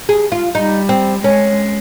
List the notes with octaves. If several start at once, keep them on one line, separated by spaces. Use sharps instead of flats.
G#4
F4
G3 D#4
C4
G#3 C#4